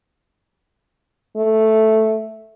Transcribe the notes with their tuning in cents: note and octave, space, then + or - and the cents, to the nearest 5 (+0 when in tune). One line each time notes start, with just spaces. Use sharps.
A3 +0